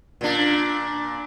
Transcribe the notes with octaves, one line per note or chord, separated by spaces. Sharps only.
A#2 D4